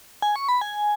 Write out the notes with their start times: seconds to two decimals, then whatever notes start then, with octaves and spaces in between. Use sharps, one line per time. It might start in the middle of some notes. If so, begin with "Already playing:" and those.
0.22 G#5
0.36 C#6
0.49 B5
0.61 G#5